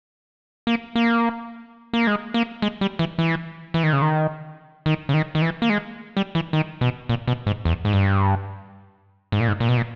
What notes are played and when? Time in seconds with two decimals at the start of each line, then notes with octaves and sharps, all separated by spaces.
0.67 A#3
0.95 A#3
1.93 A#3
2.07 G#3
2.34 A#3
2.62 G#3
2.81 G3
2.99 E3
3.19 E3
3.74 E3
3.83 D#3
3.93 C#3
4.02 D#3
4.86 D#3
5.09 C#3
5.14 D#3
5.35 D#3
5.42 E3
5.62 A#3
5.70 G#3
6.17 G3
6.35 E3
6.53 D#3
6.81 B2
7.09 A#2
7.27 B2
7.47 G#2
7.65 E2
7.85 G#2
7.93 G2
9.32 G#2
9.40 A#2
9.48 G#2
9.60 A#2
9.69 B2
9.77 A#2